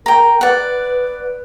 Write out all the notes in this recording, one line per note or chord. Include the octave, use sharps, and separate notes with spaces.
A#4 G5 A#5
B4 D5 F#5